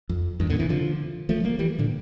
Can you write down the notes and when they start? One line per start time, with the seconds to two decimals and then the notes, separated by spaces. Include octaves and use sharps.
0.09 F2
0.40 E2 G2
0.50 A#2 D3
0.59 C3 E3
0.69 D3 F3
1.29 F3 A3
1.44 G3 A#3
1.59 E3 G3
1.79 A#2 D3